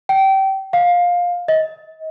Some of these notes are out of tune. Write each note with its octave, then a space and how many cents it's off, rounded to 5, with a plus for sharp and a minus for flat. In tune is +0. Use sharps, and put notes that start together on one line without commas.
G5 -25
F5 +15
D#5 +30